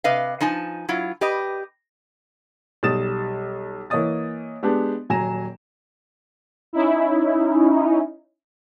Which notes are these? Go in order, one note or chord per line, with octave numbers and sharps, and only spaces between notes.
C3 B4 D#5 F5
F3 D#4 G#5 A5
F#3 E4 F4
G4 B4 D#5
B1 G3 D#6 A6 E7
E3 A#3 C#5 D#5 D#6 A6
G#3 B3 D4 G4
D#1 F#3 G#5 A#5 A#6 E7
C#4 D#4 E4